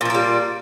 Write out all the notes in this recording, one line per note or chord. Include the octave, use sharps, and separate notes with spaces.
A#2 F3 G3 A#3